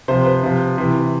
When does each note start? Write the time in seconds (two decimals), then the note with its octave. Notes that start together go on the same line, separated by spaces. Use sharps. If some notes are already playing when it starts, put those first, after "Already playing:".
0.08 C3 F3 C5
0.25 B4
0.43 C3 F3
0.78 C3 E3